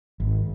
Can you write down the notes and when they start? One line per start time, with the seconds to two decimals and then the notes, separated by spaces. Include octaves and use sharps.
0.20 G#1